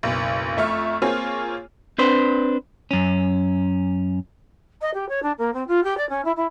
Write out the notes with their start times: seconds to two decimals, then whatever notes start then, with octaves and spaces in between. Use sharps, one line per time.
0.03 F#1 B1
0.57 F2 A3 E5 C#6 F6
1.02 A#3 C4 F4 G#4 C#5 G#5
1.98 C4 D4 B4 C5
2.91 F#2 C#4
4.81 D#5
4.94 G4
5.09 C#5
5.22 D4
5.38 A#3
5.54 C4
5.67 F4
5.83 G4
5.97 D5
6.09 C#4
6.24 E4
6.36 E4